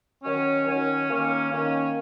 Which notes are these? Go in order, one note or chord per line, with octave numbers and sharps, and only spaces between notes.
D#3 F#3 C#4
D#3 F#3 C#4
D#3 A#3 C#4
D#3 A#3 C#4